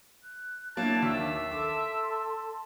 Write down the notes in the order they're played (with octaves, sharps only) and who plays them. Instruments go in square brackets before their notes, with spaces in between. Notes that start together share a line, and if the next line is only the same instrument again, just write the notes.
[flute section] F#6
[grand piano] F#3 A#3 E4 [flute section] D4 [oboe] A5
[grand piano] D#2 [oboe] E5
[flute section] A4 A5 C6 [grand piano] D6